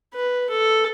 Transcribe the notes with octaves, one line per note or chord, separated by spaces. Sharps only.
B4
A4